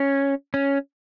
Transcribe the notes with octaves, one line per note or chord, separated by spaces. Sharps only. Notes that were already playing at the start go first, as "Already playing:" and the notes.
Already playing: C#4
C#4